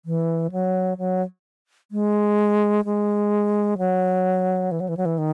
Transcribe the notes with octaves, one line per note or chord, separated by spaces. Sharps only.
E3
F#3
F#3
G#3
G#3
F#3
E3
F#3
E3
F#3
E3
D#3